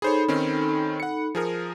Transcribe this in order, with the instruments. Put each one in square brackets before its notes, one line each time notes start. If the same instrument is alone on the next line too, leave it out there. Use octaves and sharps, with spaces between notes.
[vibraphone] D#4 A4 B5 [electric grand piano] G#4 C5 C#5
[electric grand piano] D#3 C4 C#4
F#5 C#7
F3 G#4 A#4